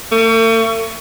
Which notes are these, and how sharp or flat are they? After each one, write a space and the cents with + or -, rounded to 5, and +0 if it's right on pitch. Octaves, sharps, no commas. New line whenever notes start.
A3 +45